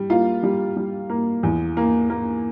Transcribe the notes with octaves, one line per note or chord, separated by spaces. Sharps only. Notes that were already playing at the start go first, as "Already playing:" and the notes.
Already playing: G3
A#3 F4 F5
G3
G3
A#3
E2
A#3
A#3